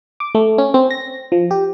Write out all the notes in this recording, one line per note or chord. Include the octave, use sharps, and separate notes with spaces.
D6
A3
C#4
C4
A#6
F3
G4